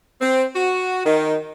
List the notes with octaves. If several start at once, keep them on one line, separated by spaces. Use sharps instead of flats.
C4
F#4
D#3